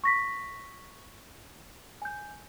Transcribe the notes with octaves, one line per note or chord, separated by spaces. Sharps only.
C#6 A#6 B6
G#5 G6